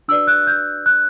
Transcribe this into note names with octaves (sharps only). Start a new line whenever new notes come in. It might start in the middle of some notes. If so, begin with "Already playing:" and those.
D4 F#4 B4 D5 E6
F#6
G6
F#6